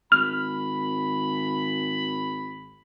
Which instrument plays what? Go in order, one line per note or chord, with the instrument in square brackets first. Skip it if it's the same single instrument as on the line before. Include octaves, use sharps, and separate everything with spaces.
[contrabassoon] G#1 [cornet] B5 [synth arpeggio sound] F6